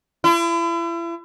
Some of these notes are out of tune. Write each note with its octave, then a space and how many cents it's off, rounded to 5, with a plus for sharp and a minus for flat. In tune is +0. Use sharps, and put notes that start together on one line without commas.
E4 +40